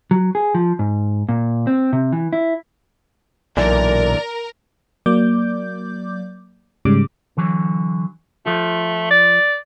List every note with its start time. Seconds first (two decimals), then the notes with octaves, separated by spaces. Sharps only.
0.11 F#3
0.35 G#4
0.55 F3
0.79 G#2
1.29 A#2
1.67 C4
1.93 C3
2.12 E3
2.33 E4
3.57 B1 A#2 D3 E3 A#4 D5
5.06 F#3 A#3 D5 D6 G6
6.85 G#2 C#3 G3 D6
7.37 D3 E3 F#3
8.46 F3 A3 F4
9.11 D5